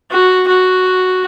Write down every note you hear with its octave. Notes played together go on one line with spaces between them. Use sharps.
F#4
F#4